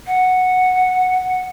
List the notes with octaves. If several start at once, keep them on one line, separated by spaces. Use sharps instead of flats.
F#5